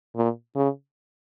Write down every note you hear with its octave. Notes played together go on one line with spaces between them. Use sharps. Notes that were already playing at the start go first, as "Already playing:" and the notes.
A#2
C#3